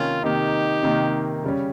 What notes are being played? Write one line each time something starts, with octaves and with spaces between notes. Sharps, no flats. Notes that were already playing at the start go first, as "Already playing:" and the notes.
Already playing: C3 D#3 A#3 C#4 F4
C3 D#3 A#3 D#4 G4
C3 D#3 A#3
C#3 G3 C#4